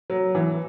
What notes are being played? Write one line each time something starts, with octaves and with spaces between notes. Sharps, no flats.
F#3
E3